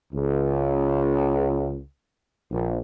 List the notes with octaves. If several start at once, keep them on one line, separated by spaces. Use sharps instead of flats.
C#2
A#1